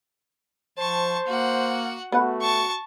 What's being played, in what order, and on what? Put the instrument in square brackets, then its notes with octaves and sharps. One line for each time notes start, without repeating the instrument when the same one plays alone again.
[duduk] F3 [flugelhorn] C5 [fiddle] A5 C#6
[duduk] A#3 [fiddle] F#4 F#5
[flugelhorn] A3 [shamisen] B3 B4 F#5 [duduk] F#4
[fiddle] A5 C#6